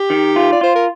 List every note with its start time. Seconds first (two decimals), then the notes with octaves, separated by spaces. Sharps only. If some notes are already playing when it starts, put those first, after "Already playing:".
Already playing: G4
0.10 D#3
0.36 F4
0.53 D5
0.61 F4 C5
0.75 A#4